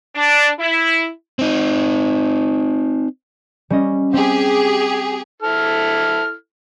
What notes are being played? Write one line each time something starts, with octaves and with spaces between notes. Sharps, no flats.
D4
E4
C4 D#4
G3 C#4 D#5
C4 G4 G#4
E4 A4 F6